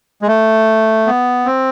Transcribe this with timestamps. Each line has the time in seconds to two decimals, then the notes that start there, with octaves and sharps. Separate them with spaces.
0.22 G#3
0.28 A3
1.06 B3
1.45 C4